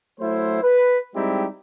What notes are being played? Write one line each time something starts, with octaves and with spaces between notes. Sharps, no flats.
F#3 A3 E4 C5
B4
G3 G#3 C4 D#4 E4 G4